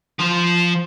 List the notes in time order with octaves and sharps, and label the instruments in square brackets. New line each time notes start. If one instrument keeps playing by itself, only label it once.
[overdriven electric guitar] F3 C5